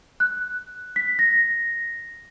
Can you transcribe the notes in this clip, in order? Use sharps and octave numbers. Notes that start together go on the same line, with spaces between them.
F#6
B6
A#6